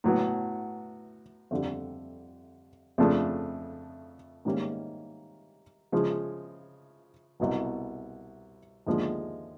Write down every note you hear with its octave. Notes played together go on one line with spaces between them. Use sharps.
A2 F#3 B3
F2 D3 G3
F2 C#3 F3 A3 D4
G#2 D#3 G3 A#3 C#4
C#3 F3 G#3
C2 B2 F#3
D#2 D3 F3 G#3